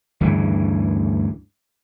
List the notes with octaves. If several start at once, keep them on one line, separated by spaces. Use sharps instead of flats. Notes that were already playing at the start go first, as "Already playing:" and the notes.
D2 G2 C#3 E3